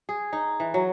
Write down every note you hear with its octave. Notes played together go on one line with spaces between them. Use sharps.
G#4
D#4
E3
F#3